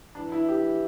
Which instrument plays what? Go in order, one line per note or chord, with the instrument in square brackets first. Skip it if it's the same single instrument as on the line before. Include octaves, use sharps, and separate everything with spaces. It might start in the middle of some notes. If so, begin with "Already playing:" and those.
[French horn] E3 [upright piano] D4
[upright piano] E4
G4